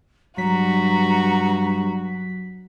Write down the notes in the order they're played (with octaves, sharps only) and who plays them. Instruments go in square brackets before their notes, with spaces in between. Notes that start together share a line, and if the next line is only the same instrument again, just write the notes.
[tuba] G2 [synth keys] F#3 B6 [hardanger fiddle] F#4 [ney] A#5